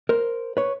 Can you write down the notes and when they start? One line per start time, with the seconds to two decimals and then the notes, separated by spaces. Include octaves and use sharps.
0.09 A#4 C5
0.57 B4 C#5